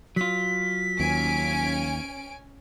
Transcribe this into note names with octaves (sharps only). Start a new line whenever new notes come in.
F#3 F4 B6
D#2 C#4 G#5 D7